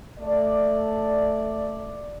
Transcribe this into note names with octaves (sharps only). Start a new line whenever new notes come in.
A3 D5